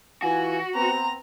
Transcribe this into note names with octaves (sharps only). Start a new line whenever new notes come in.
E3 F4 F#4 G#5
B3 C4 A#5